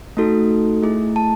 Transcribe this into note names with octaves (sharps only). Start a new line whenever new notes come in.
A3 D#4 F#4 A4
A3 E4 G#4
A5